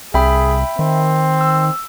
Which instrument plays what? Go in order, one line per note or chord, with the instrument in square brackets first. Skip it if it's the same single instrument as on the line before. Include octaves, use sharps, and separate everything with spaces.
[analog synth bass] C2 [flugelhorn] G#4 [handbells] E5 G5 B5
[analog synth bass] D#3 [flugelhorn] C4
[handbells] E6